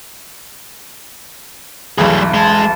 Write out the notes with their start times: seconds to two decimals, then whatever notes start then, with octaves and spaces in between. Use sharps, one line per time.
1.98 B1 E2 G3 A3 G#4
2.34 G#3 A5